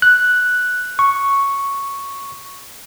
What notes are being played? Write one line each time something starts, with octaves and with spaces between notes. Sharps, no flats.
F#6
C#6